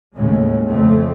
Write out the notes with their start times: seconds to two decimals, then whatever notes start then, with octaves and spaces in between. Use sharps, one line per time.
0.16 D#2 A2 C#3 G#3
0.68 F2 C#3 A3 C4